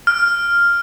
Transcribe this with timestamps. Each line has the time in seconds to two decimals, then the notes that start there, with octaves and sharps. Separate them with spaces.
0.07 F6